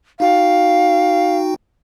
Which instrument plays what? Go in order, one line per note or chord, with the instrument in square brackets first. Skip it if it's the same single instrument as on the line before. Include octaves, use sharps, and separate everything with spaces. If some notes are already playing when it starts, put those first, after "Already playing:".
[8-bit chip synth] D#4 F#4 G5 [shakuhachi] F5